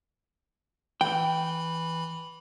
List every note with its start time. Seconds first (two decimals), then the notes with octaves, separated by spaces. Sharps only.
1.01 E3 G5 B5